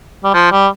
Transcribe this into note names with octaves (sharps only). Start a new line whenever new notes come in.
G3
F3
G3